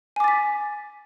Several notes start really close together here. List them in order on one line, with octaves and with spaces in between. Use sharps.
G#5 D6 A6 B6